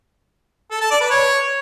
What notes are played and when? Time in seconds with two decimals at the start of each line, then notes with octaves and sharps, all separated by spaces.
0.71 A4
0.81 A5
0.91 D5
1.00 B4
1.10 C#5